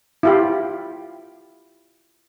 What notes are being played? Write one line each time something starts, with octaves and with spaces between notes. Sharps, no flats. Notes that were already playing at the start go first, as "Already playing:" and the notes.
E4 F4 G4